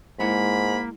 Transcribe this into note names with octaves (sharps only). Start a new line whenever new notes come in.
G#2 G#3 A#3 E4 F#5 B5